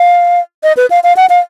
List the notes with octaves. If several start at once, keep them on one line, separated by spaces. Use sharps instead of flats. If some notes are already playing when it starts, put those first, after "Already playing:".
Already playing: F5
D#5
B4
F5
F5
F#5
F5